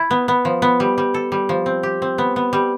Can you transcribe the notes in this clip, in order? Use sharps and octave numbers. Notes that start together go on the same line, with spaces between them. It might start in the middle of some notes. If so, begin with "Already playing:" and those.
Already playing: E4
B3
B3
F3
B3
G3
G3
A4
G3
F3
C4
G4
C4
B3
B3
G3